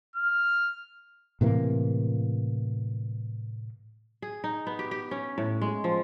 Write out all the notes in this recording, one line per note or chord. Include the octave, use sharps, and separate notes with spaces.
F6
A2 C3 E3 A#3
G#4
D#4
B3
G4
G4
C#4
A2
G#3
F3